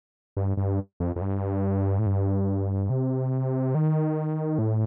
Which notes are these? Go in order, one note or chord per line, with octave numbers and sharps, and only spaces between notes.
G2
G2
F2
F2
G2
A2
G2
C3
D#3
A2